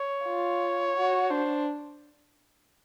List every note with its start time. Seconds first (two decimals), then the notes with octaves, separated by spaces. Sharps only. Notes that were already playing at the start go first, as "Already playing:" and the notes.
Already playing: C#5
0.25 F4
0.96 F#4
1.30 D4 C5